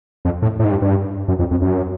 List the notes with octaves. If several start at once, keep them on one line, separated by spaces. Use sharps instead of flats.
F2
A2
A2
G#2
G2
G2
F#2
F2
F2
F#2